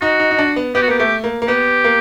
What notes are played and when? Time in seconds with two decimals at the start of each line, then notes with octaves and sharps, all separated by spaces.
0.01 D#4 F#4
0.20 D#4
0.31 D#4
0.38 D4
0.56 B3
0.75 B3 G4
0.83 F#4
0.88 A#3 G4
0.98 A3 G4
1.24 A#3
1.42 A#3
1.48 B3 G4
1.84 A#3